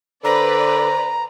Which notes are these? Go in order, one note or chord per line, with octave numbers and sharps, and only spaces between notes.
D3 B4 C5 D5 A#5